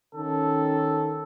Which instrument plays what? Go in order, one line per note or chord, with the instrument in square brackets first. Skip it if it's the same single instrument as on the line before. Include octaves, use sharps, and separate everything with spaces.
[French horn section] D#3 C#4 [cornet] A4